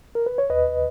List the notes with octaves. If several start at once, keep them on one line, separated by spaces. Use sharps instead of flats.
A#4
B4
C#5
D#2 B4 D#5